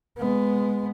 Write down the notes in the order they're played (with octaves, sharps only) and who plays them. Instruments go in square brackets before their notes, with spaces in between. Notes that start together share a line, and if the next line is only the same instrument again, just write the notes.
[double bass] G#3 B3